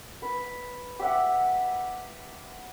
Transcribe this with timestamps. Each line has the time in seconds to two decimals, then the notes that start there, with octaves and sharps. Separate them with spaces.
0.22 B4
0.99 G4 E5 F#5